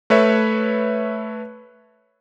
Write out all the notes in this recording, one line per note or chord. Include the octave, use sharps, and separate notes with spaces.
A3 B4 C#5 E5